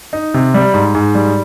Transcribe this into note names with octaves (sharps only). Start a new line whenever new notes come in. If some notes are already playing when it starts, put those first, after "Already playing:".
D#4
C3
G3
G#2
G#2
G3